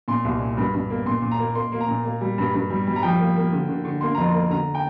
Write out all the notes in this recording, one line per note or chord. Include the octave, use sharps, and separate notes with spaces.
A#2 C6
C2
A#2
G2
G2
A#3
A#2 C6
A#2
A#5
A#3
A#3 C6
A#3
A#5
A#2
A#3
G3
G2
G2
G3
G3
A#5
F3 G5
A#3
A#3
D3
D3
D3
A#3 C6
F2 A#5
C6
A#3
D3 A#5
G5